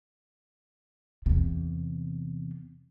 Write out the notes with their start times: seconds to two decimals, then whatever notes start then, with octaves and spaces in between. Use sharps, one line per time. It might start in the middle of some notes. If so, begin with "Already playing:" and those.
1.26 E2 C3